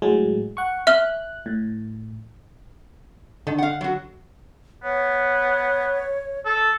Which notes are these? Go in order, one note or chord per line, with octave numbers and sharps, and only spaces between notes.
A2 F#3 G#3
F#5 C#6
E5 F6 F#6 G7
A2
D3 D#3
F5 F#5
F#3 F#4
B3 C#5
A4